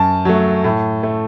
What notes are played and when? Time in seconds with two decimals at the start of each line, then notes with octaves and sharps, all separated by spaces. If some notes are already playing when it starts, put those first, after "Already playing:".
Already playing: F#2 A5
0.25 F#3 A3
0.64 A2
1.03 A3